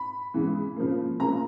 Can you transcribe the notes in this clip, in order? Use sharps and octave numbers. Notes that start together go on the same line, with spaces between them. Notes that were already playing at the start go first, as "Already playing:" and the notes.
Already playing: B5
C#3 E3 G#3 B3
C#3 F3 A#3
C#3 F3 A#3 A#5